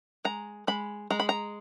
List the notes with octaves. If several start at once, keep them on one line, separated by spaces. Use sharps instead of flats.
G#3 A#5
G#3 B5
G#3 A#5
B5
A#5